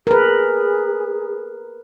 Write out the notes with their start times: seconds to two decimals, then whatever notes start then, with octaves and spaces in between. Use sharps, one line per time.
0.07 G#4 A#4 B4